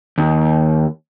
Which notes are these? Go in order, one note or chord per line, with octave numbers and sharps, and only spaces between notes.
D#2